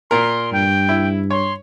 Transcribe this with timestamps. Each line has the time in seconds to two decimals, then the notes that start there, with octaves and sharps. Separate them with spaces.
0.11 A#2 A#4 C6
0.53 G2 G5
0.89 E4
1.31 C#5 C6